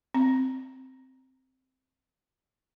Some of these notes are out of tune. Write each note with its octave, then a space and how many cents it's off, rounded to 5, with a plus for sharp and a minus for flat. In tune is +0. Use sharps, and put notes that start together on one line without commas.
C4 -5